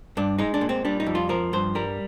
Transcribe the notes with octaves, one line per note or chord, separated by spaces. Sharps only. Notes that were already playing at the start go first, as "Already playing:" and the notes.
G2 D4
G#3 D#4
D4
A#2
C4
G3 D4
D#4
F2
F4
F3 A#4
G2 C5
G3 A#4